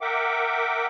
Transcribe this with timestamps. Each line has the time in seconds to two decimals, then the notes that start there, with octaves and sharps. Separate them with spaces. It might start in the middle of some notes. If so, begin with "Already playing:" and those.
0.01 A#4 E5 F#5 G5 D6